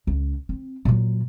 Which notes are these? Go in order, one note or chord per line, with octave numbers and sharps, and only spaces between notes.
C#2
C4
A#2 F#3